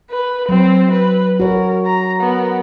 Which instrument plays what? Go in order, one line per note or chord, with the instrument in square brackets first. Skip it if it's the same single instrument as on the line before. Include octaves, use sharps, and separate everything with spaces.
[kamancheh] B4
[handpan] F#3 [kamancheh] C4
[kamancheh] B4
[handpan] F#4 C#5 [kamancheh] A#4
[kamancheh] A#5
B3 A#4